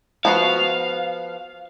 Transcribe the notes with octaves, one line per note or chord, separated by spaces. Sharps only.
F3 B3 F#4 F5